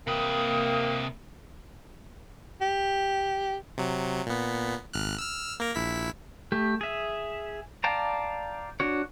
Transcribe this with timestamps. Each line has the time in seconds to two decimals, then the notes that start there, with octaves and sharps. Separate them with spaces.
0.07 C3 A#3 B4 G5 D#6
2.61 G4
3.78 C3 F#3
4.27 A#2 B3
4.93 G#1 F6 F#6
5.18 E6 F6
5.60 A#3 A#4
5.75 A#1 E4 B6
6.52 A3 G4
6.81 G#4 E5
7.84 D5 F5 G5 A5 A#5
8.80 D4 F#4 C#5